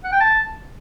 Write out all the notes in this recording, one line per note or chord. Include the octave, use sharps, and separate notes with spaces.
F#5
G5
A5